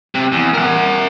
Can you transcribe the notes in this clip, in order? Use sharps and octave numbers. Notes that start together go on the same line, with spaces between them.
C3
E2
A#4 F#5